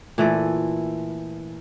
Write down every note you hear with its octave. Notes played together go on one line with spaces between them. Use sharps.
A#2 E3 A3 D5